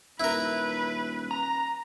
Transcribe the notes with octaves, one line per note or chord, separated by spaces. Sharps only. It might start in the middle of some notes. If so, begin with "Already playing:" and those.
D#1 E4 A#4 B4
A#5